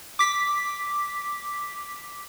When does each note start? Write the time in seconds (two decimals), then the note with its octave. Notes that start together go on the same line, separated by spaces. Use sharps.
0.19 D6 B6